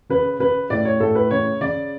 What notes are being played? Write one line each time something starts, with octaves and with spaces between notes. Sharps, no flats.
C#3 B4
C#3 B4
A2 D5
C#5
A2 A4
B4
C#3 C#5
C#3 D5